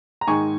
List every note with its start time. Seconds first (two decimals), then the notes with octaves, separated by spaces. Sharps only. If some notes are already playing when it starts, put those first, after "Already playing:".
0.21 A#5
0.27 G#2 D#3 G#3 D#4 G#5 C#6